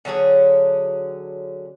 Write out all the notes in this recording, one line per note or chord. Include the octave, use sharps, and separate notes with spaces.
D3 F#3 C#4 G#4